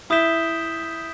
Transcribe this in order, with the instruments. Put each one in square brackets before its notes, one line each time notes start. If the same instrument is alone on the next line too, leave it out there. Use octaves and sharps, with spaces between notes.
[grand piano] E4 [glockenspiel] D#6 G6 B6 E7 G7